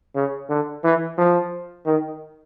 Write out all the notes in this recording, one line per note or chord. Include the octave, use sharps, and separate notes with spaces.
C#3
D3
E3
F3
D#3